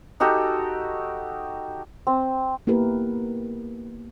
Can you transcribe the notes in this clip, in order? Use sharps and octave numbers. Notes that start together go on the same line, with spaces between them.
D#4 F#4 G4 A4
C4
A#3 B3 E4 G4 A#4 B4